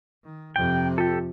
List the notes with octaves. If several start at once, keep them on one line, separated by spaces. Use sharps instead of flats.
D#3
F2 C3 G5
F4 G4 A4